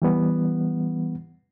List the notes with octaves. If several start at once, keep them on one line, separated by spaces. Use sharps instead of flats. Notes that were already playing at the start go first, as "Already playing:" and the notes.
E3 G3 B3